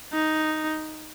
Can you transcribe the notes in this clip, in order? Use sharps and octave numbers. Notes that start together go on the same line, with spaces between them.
D#4